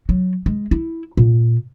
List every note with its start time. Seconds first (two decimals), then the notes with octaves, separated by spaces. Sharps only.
0.09 F#3
0.46 G#3
0.71 E4
1.17 A#2